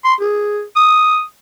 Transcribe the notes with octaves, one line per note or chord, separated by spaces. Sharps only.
C6
G#4
D#6